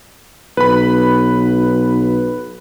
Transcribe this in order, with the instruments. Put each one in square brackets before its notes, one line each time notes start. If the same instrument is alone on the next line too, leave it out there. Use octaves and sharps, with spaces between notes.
[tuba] B1 [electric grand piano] B4 B5